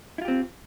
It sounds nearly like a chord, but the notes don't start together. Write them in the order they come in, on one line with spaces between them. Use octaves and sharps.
E4 F4 G4 C4